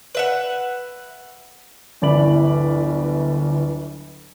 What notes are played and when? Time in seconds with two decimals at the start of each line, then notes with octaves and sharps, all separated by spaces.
0.15 B4 E5 F#5
2.02 D1 G1 E3 D5 B5 F#7